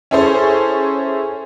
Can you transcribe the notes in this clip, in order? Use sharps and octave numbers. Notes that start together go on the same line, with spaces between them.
C#4 E4 G#4 A4 C5 C#5